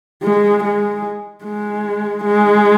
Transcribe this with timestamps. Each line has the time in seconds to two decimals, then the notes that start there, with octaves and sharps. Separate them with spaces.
0.23 G#3
0.64 G#3
1.45 G#3
2.24 G#3